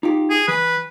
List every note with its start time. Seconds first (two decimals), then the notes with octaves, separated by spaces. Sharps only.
0.03 D#4 F4 G4
0.31 G#4
0.48 E3 B4